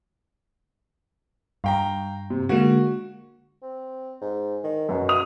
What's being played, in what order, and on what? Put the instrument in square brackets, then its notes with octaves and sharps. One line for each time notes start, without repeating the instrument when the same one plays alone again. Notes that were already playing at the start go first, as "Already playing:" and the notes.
[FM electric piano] G2 [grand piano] F5 G5 A#5
[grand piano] C3
[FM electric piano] D3 G#3 A#3 [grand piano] F#4
[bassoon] C4
G#2
D#3
[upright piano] F#2 [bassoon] B2
[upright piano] D#6 F7